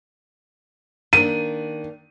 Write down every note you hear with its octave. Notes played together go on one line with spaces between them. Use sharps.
D#3 A#3 D4 D#7